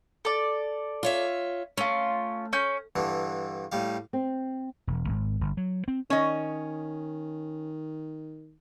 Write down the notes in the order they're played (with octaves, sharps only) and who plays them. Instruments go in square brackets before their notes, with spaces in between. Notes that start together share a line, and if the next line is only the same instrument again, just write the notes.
[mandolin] A4 D5
[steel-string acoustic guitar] F4 C#5 E5
[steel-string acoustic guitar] A3 [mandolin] C#4 F4
[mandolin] C#4 G6
[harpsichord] G2 D3 E3
A2 G3 F5
[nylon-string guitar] C4
[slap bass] E1
G#1
G1
F#3
C4
[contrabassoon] D#3 [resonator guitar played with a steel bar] C#4 D#5